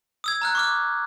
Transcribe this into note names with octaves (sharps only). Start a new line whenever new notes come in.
D#6 E6 G#6
A#5 F6 F#6
C#6 D6 F6